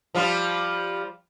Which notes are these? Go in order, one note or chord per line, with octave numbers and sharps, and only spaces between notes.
F3 G3 F4